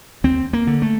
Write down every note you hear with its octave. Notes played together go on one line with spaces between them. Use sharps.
D#2 C4
A#3
D3
A3